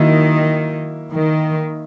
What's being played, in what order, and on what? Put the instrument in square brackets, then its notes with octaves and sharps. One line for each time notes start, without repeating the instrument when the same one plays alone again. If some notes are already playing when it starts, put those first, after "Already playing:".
Already playing: [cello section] D#3 [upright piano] F#3 A#3 E4
[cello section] D#3